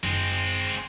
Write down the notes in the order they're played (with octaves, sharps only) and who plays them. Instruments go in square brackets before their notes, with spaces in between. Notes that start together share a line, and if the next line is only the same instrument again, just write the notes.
[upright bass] F#1 [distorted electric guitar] G#3 C4